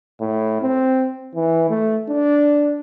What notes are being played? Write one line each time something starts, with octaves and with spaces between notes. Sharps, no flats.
A2
C4
E3
A3
D4